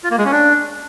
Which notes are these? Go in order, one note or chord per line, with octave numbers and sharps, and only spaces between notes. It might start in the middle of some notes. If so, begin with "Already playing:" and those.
F4
A#3
G#3
C#4
D4